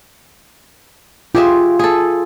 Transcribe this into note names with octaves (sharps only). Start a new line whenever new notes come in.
F4 G4 G#4 E5
G#4 A4